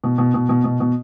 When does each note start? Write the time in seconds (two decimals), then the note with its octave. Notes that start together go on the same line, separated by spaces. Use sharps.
0.04 B2
0.18 B2
0.34 B2
0.49 B2
0.64 B2
0.80 B2